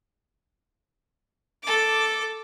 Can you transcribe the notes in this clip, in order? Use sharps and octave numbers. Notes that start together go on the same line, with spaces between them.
A4 D6